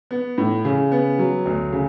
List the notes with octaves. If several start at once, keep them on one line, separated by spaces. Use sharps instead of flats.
B3
A2
C#3
B3
F#3
D2
C#3